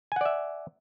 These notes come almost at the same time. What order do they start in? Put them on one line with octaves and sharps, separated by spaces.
G#5 F#5 D5 E5